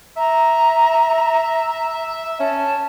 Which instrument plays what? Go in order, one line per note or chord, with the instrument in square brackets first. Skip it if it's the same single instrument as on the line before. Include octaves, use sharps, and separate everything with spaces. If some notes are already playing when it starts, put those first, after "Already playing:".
[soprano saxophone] E5 [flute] A#5
[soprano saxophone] C#4 [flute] A5